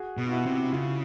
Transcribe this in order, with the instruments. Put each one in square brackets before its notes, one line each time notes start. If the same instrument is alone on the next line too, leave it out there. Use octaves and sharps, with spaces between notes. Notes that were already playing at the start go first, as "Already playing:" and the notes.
Already playing: [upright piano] F#4 G#4
[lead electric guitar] B2
[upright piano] F4
E4 F#4
[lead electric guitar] C3
[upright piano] E4
[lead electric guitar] C#3 [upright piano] F4